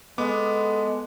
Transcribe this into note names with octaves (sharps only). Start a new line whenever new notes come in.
G#3 B3 A4 D6